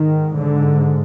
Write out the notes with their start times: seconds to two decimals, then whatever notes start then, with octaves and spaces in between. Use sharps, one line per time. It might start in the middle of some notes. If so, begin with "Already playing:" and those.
Already playing: G#2 D#3
0.37 D3